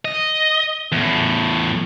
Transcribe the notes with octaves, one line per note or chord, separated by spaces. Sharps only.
D#5
E2 A2